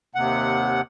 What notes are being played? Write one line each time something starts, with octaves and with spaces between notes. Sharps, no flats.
D#2 C3 F#5